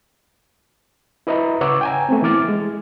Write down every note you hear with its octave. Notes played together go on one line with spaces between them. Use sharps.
E4 B4 D#5 E5 A#5 B5
C#3 B4 C#5 F#5 D6 E6
G5 G#5 A#5
A3 B3 C4
E3 E4 D6 F6 A6
G#3